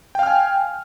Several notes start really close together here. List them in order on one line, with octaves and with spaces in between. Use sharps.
G5 F5 F6 G#5